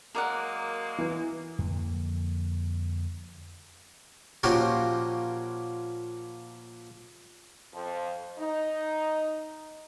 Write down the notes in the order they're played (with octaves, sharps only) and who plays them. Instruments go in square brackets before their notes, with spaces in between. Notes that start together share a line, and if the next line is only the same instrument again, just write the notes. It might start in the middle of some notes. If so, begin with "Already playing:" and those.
[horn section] F#3 G#3 A#3 [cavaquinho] A#4 D5 F#5
[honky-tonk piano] E3
[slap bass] F2 D3 A#3
[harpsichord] A#2 F3 A#3 C#4 F#4 G4
[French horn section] F2
D#4